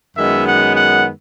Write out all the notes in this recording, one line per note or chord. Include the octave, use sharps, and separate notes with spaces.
F#2 D#3 G#3 B3 E5
F#5
F#5